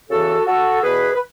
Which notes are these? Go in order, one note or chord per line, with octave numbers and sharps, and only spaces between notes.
E2 C#3 E3 F#4 A4
F#4 A4
E2 B2 G#4 B4
B4